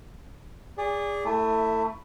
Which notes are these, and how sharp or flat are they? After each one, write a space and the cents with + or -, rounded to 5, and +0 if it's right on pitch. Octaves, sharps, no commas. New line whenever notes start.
G#4 -25 D5 -20
A3 +25 E4 +0 E5 +0